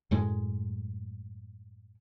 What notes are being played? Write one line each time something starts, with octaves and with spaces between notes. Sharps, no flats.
F#2 A2 G#3